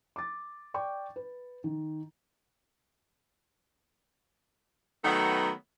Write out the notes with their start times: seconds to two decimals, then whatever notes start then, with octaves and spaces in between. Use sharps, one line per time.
0.16 D6 A6
0.74 D5 G5 C#6 D6
1.16 B4
1.64 D#3
5.04 D#3 F#3 A3 B3